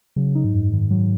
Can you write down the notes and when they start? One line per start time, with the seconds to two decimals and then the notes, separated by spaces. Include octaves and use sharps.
0.16 C#3 F#3
0.35 D#4
0.45 G#2
0.53 F#2
0.72 D#3
0.90 F#3